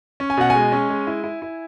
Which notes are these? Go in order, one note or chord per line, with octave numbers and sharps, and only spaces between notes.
C#4
G#5
B2 F#5
G#5
G#3
C#4
G#3
E4
E4
E4